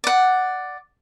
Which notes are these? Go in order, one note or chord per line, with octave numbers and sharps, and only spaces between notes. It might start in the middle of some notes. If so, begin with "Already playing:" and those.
D5 F#5